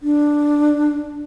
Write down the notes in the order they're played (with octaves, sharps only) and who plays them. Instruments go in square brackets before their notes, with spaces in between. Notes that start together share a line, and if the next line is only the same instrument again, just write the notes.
[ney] D4